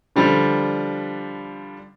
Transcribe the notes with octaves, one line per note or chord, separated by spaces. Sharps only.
D3 F3 G3 D4